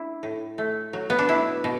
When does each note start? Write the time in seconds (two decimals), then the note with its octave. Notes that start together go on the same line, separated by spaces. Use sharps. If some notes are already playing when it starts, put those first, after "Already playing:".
Already playing: D4 E4
0.23 A2
0.58 A3
0.93 F#3
1.10 B3
1.19 D4
1.28 B2 E4
1.64 B2